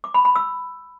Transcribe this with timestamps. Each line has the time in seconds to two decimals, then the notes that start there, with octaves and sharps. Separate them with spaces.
0.04 D6
0.14 B5
0.25 B5
0.36 E6